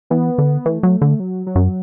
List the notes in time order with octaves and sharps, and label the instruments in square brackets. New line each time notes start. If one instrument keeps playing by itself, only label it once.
[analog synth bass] E3 [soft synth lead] B3
[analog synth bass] D3
[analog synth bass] E3 [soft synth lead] A3
[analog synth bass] F#3
D3
[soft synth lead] F#3
F#3
[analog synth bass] F#2